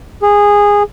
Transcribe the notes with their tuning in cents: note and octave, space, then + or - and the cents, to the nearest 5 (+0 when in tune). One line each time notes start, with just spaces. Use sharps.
G#4 -15